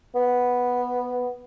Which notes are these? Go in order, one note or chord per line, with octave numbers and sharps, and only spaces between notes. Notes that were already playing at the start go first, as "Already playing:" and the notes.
B3